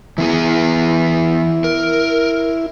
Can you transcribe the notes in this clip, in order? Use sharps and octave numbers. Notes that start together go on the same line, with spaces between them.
E3 B3 E4 G#4
A#4